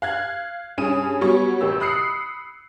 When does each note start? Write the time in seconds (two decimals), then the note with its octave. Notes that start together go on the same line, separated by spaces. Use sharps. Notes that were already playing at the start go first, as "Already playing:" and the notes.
0.02 F5 F#6 G#6
0.78 G2 C#4 G#4 D#6 D#7
1.21 F#3 G3 B3 C#5 C#6
1.61 A1 G4 E6
1.80 B5 D#6 F#6 C7 C#7